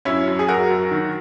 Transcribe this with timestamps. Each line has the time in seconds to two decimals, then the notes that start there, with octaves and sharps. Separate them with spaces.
0.05 F#2 C#4 E4
0.27 F#2
0.39 G#4
0.48 F#2 F#4 A#4
0.70 F#2
0.91 D#3